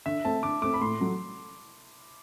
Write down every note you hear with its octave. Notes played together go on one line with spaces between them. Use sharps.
D3 E5
A3 C4 A5
D3 D6
A3 C4 D6
B5
A2 C6
F#3 A3